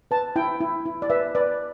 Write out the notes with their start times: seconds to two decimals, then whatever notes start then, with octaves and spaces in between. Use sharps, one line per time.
0.11 B4 A5
0.36 E4 G5
0.60 E4
0.86 E4
1.02 D5
1.10 B4 E5
1.35 B4 D5